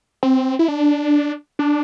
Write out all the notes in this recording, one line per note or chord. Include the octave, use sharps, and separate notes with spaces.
C4
E4
D4
D4